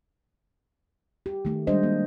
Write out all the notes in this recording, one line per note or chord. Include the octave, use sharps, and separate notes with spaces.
G4
D#3 A3
G3 G#3 D4 C5 D#5
A#3